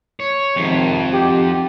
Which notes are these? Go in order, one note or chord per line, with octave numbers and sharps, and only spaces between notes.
C#5
F2 G#2 C3 D#3
D#4 F#4 G4